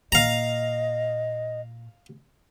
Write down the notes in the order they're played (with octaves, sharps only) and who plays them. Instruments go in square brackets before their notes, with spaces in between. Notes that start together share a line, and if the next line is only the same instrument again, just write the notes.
[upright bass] A#2 [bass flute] D#5 [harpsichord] F5 A#5